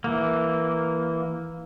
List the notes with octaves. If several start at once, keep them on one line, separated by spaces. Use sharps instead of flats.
E3 A#3